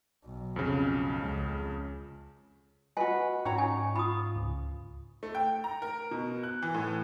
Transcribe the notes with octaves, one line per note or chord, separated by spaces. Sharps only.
B1
F2 C#3
C#2
F#4 B4 D#5 G#5
G#2 C#4 F#4 C#5 A#5 C#6
D#4 G#5
F4 B5 D#6
C#2
A3
G5
A#5
A#4
B2
F#6
E3
A2